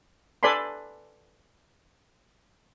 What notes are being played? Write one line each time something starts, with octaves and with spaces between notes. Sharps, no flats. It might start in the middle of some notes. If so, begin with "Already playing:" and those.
A4 B4 D5 G#5 B5 C6